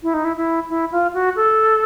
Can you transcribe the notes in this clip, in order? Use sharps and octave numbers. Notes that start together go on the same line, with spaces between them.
E4
D#4
E4
E4
E4
F4
F#4
A4